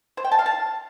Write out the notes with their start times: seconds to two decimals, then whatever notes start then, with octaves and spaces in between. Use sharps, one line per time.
0.17 C5
0.24 G5
0.32 A5
0.39 F5
0.46 A5